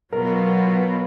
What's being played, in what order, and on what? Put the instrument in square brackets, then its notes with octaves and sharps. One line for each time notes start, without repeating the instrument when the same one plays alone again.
[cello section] B2 F#3 B3 F4 [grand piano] A#4